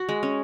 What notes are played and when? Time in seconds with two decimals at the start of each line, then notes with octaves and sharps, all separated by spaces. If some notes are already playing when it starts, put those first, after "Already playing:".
Already playing: F#4
0.09 G#3
0.23 C#4